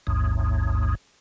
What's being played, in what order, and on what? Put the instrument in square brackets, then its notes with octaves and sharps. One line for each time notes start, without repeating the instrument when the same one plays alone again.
[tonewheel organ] A1 D#2 G#2